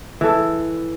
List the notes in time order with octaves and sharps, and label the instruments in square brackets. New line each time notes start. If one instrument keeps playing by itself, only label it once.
[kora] E3 A4